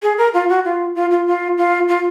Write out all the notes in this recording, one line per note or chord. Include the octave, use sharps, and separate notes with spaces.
G#4
A#4
F4
F#4
F4
F4
F4
F4
F4
F4